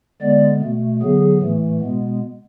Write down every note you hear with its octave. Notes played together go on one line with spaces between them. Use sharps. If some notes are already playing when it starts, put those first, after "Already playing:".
D3 G#3 B3 D5
B2 A3
D3 F#3 B3 G#4
A2 E3 A3
B2 G#3 B3